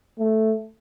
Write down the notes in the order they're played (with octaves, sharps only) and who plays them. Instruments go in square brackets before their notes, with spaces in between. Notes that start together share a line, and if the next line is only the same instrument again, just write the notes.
[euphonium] A3